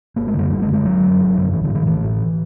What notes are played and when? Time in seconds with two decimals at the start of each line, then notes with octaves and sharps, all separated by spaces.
0.16 G#1 A#3
0.27 G#3
0.34 F#2 D3 G3
0.50 G#1 G3
0.62 G#3
0.67 F#2 D3
0.73 G#3
0.84 G#1 F#3
1.02 F#2 D3
1.19 G#1
1.35 F#2 D3
1.52 A1 E3
1.64 D3
1.69 A2
1.75 D#3
1.86 A1 E3
2.04 A2